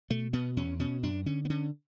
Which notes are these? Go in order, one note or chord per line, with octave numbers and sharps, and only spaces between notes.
B2 A3
B2 B3
E2 C#4
B2 C#4
F#2 D4
D3 C#4
B3
D3 C#4